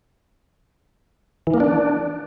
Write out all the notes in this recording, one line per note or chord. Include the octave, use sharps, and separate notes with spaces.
E3
A#3
D4